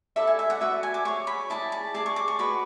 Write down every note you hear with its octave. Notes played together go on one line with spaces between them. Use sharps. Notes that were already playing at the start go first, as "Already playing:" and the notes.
E4 A4 D5 E5
G#5
E5
F#5
F#4 B4 D5 E5
G#5
D6
G#4 C#5 C#6
B5
E4 G#4 D5 A5
A5
G#4 D5 A5
C#6
D6
C#6
F#4 B4 D5 B5